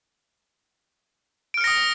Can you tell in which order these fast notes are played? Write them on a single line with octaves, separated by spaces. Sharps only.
D7 F6 C#7 A#6 D#6